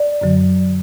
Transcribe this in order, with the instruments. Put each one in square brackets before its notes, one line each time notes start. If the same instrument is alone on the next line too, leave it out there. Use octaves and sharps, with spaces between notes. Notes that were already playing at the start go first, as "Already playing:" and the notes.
Already playing: [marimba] D5
F#2 D3 F#3